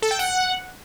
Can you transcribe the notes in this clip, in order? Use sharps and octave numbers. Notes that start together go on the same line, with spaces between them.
A4
G5
F#5